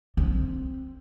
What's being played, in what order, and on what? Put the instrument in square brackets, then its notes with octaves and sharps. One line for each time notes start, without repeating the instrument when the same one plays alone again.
[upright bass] C4